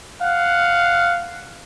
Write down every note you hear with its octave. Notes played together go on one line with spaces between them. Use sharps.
F5 F#5